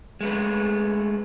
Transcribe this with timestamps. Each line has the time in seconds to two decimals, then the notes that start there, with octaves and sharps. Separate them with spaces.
0.21 G#3 A3 B4